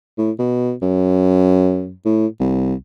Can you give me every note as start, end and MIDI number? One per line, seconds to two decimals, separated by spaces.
0.18 0.31 45
0.39 0.73 47
0.82 1.93 42
2.05 2.26 45
2.40 2.74 36